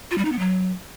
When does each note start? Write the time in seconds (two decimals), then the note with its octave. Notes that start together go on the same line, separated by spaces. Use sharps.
0.11 F4
0.18 G3
0.25 D#4
0.32 B3
0.39 F#3